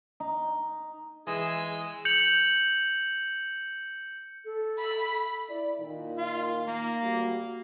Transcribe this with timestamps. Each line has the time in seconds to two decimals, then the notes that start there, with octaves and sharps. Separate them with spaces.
0.20 D#4
1.27 E3 G#3 G#4 E6
2.05 G6 C#7 F7 F#7
4.45 A4
4.79 B5
5.49 E4 D5
5.79 A#2 D#3
6.18 F4
6.67 A#3
7.02 D2 G3 F#4